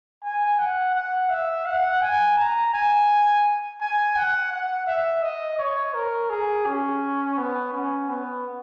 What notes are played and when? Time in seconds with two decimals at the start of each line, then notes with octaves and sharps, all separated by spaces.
0.23 G#5
0.59 F#5
0.95 F#5
1.30 E5
1.66 F#5
2.02 G#5
2.37 A#5
2.73 G#5
3.81 G#5
4.16 F#5
4.52 F#5
4.87 E5
5.22 D#5
5.59 C#5
5.94 A#4
6.30 G#4
6.66 C#4
7.38 B3
7.73 C#4
8.09 B3